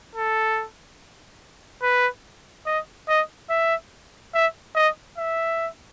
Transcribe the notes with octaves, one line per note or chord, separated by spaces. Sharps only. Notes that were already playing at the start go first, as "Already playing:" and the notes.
A4
B4
D#5
D#5
E5
E5
D#5
E5